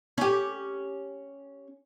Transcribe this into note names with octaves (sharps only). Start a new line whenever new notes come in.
C#4 G4